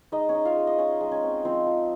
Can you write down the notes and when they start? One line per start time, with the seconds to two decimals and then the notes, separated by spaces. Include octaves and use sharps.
0.12 G#3 D#4 D#5
0.29 C#4 C#5
0.34 D#4
0.45 F4 F5
0.56 G#3
0.67 D#5
0.78 C#4 F4 C#5
1.01 G#3
1.12 C#4 C#5
1.23 C4
1.44 F3 C4 C5
1.67 F3